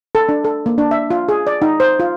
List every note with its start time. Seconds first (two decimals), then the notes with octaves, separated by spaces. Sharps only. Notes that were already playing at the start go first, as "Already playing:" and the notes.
0.15 A4
0.29 D4
0.44 A4
0.66 A#3
0.78 D4
0.91 E5
1.10 F4
1.29 G#4
1.47 D5
1.62 D#4
1.80 C5
2.00 F4